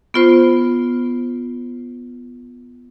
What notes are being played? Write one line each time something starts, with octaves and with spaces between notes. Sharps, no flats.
B3 F4 C5